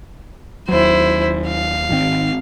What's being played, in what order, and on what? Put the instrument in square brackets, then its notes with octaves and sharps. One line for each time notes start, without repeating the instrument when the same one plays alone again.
[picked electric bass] D#2 F#3 [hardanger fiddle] E4 C5
[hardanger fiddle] F5
[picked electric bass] G#1 D#3 C4